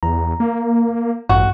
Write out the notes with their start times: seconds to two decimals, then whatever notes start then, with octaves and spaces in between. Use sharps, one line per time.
0.03 E2 A#5
0.40 A#3
1.29 A1 G2 F#4